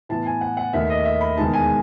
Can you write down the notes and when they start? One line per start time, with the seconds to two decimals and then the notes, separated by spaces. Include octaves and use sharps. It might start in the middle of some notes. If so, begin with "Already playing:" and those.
0.09 A2 E3 B3 A5
0.26 G#5
0.41 F#5
0.57 F#5
0.73 D#2 D#3 A3 E5
0.90 D#5
1.05 E5
1.21 B5
1.36 E1 E2 D#3 G#3 D#4 A5
1.53 G#5